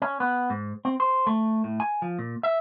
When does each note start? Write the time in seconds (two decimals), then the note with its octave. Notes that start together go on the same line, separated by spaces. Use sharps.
0.02 C#4
0.20 B3
0.50 G#2
0.85 C4
1.00 C5
1.27 A3
1.64 A2
1.80 G#5
2.02 F3
2.19 A#2
2.43 E5